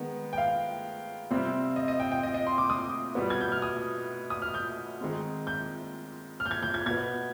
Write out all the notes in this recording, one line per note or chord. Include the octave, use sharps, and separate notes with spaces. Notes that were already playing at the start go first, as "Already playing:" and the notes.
Already playing: D#3 G#3 B3
G5
F5
C3 G3 C4
D#5
D#5
G5
G5
D#5
D#5
C6
D6
D#6
B2 G3 B3
G#6
G6
F6
D#6
D#6
F6
G6
D#3 G#3 C4
G6
F6
G6
G#6
G6
G#6
B2 B3 G#6